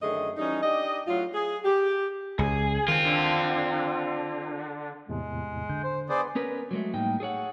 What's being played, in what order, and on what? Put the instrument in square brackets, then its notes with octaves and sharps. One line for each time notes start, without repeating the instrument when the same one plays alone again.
[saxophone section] F#2 D3 D#3 A3 G#4 D#5
E3 G3 C#4 D#4
D4 D#4 G4 D#5
A2 F#3 F4
G#4
G4
[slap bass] C#2 [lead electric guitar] G#4
[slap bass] D#3 [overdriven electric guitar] C4 F4
[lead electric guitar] D3
[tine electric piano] E2 A2 C3 [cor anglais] G#3
[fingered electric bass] D3 [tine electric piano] G6
[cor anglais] C5
[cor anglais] B3 [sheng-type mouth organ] G#4 C5 D5 [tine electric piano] B4 G#5 C6
[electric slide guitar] B3 C#4 A#4 B4
F#3 G#3 A3
A2 G3 A#3 D#4 G5
G#4 A4 C#5 F#5